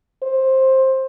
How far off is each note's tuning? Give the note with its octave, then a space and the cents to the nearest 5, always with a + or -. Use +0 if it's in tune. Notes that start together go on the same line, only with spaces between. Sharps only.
C5 +15